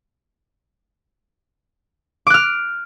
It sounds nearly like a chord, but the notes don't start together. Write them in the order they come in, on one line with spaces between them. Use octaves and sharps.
D6 F#6 F6